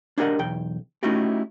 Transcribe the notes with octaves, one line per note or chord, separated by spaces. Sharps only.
D4 E4 G4 A#4 D#5 F#5
B1 E2 G5
A3 C#4 D#4 E4 F#4 G4